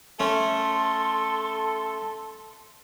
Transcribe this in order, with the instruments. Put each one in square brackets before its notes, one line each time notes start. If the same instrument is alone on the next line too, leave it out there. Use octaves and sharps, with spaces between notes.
[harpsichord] A3 C#4 [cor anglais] A4 [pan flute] C6